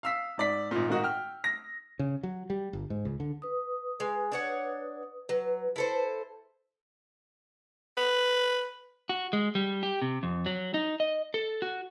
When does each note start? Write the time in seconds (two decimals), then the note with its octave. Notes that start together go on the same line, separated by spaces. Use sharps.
0.03 F5 E6 B6
0.38 G#2 D5 B6
0.71 G#1 A#2
0.88 G#2 D#3 A#3 D#4 F#4
1.03 G5 F6
1.44 A#6
1.99 C#3
2.23 F#3
2.50 G3
2.73 G1
2.90 G#2
3.05 C#2
3.20 D3
3.42 B4 D#6
4.00 G#3
4.32 D4 C#5 F#5
5.29 F#3 B4
5.76 E4 A4 C5
7.97 B4
9.09 F#4
9.33 G#3
9.55 G3
9.83 G4
10.02 C3
10.23 F2
10.46 F#3
10.74 D#4
11.00 D#5
11.34 A4
11.62 F#4